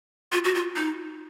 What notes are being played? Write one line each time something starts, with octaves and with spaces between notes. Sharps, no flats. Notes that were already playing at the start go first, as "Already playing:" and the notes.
F4
F#4
F4
D#4